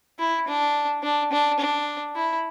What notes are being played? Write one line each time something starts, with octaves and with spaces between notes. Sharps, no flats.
E4
D4
D4
D4
D4
E4